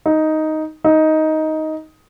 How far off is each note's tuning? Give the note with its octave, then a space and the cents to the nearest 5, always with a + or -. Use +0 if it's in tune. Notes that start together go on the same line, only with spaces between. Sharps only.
D#4 +5
D#4 +10